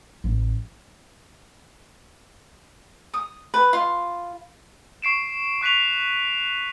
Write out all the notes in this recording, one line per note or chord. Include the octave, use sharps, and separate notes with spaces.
A1
D#6
B4
F4
C#6 C7 D7 E7
C#6 F#6 B6 D#7 F7